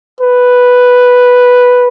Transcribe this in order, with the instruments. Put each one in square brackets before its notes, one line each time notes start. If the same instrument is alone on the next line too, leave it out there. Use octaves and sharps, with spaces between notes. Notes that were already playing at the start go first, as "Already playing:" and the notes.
[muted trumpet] B4